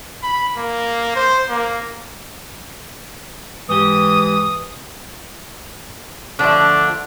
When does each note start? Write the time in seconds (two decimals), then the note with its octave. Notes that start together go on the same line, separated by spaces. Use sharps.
0.23 B5
0.58 A#3
1.15 C5
1.50 A#3
3.69 G#2 E3 G4 D#6
6.39 D3 F3 A3 D4